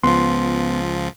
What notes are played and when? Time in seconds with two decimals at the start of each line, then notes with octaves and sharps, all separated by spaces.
0.03 C#2 F3 B3 C6